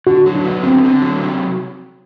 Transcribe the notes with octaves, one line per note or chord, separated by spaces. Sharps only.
D3 F#4
F#3
D4
B3
D3 C4
D3
F#3
C3